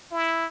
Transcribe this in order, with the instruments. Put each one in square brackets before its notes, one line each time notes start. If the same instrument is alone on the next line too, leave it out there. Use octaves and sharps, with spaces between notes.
[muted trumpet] E4